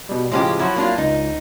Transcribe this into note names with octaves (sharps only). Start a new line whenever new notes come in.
B2 G3
A2 C#3 F3 G#3 C#4 G4
F3 F#3 E4 F#4
A#3 D4 F4
C#2 D#4